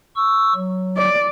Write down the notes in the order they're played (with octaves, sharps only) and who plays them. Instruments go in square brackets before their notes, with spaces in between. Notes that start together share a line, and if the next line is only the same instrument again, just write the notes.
[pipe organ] C#6 E6
F#3
[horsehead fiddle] D5